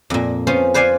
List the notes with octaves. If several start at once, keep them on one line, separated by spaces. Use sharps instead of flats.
F2 A#2
B3 C#4 F4 C5
B4 C5 D5 F5 G#5